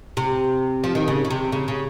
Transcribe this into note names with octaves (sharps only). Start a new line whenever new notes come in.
C3
F3
D#3
C#3
C#3
C3
C#3
C#3